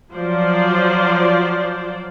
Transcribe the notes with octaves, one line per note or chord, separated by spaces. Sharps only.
F3 F#3 C5 D5